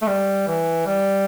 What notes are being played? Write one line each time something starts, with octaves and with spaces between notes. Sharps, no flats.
A3
G3
E3
G3